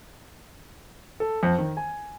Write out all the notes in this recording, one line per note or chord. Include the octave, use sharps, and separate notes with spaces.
A4
F2
D#3
G#5